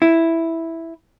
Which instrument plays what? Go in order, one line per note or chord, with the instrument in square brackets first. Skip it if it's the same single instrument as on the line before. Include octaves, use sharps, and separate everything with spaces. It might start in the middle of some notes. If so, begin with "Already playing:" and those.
[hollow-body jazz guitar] E4